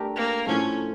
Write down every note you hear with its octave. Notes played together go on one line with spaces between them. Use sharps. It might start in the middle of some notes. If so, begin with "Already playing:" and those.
Already playing: A3 D4 G4 A#4
A#3
A2 F3 A3 C#4